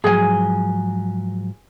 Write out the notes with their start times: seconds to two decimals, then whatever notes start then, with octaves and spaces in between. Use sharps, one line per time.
0.04 G#2 F3 F#3 G#4 G#5